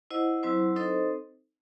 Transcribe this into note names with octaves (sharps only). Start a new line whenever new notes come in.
E4 C5 D#5 F#5
F#3 C4 E4 C5
C4 D#4 A4 C5 D#5